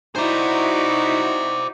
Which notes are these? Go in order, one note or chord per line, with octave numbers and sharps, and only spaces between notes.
D#4 E4 F#4 C5 D5